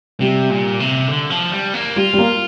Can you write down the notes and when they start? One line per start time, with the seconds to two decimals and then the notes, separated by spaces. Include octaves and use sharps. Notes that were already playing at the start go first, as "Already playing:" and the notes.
0.20 C3 G3
0.50 A#2
0.80 C3
1.08 D3
1.30 F3
1.52 G3
1.74 A#3
1.96 G3 F4
2.13 G3
2.18 A#3